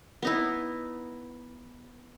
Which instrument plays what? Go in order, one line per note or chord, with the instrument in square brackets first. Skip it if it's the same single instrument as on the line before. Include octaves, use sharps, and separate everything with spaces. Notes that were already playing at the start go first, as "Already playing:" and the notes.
[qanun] B3 D#4 E4